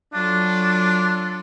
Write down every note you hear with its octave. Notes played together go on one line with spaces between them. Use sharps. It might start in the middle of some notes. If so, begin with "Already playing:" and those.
F#3 D4 F4 A4